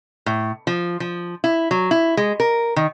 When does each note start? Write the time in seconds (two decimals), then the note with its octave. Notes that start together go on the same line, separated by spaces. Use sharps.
0.26 A2
0.67 F3
1.00 F3
1.44 E4
1.71 F#3
1.91 E4
2.17 G#3
2.40 A#4
2.76 D#3